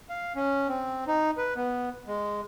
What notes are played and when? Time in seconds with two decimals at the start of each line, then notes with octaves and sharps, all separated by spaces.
0.10 F5
0.36 C#4
0.68 C4
1.07 D#4
1.37 B4
1.56 B3
2.07 G#3